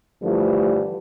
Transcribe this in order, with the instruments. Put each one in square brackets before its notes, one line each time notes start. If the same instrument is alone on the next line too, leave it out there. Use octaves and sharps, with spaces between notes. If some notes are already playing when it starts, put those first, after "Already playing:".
[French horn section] G2 D3 E3 F3 G3 A3